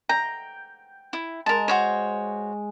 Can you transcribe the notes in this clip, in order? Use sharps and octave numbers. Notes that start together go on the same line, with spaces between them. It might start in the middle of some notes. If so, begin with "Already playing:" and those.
G5 A#5
E4
G#3 A#4 A5
F#4 C5 C#5